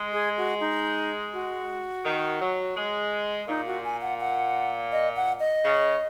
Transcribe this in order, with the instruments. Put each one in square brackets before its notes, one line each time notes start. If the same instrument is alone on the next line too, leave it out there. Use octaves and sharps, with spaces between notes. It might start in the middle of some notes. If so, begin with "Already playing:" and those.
Already playing: [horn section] G#3
[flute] G#4
F#4
D#4
F#4
[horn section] D#3
F#3
G#3
[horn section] A#2 [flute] D#4
[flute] F#4
G#5
F#5
F#5
D#5
F#5
D#5
[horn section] C#3